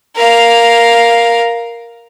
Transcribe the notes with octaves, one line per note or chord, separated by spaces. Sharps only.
A#4 F5